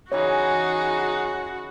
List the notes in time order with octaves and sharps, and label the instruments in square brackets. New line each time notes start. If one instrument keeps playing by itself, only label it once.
[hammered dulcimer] C#3 E3 E4 [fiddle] D#4 G#4 [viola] F#4 [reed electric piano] C#5